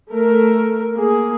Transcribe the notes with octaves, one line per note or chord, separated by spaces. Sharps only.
A3 A#4
A#3 G#4